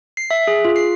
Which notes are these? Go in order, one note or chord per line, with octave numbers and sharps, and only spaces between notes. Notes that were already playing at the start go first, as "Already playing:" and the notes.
C7
E5
G#4
F4
C7